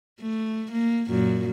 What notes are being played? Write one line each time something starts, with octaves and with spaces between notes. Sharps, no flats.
A3
A#3
F#2 A#2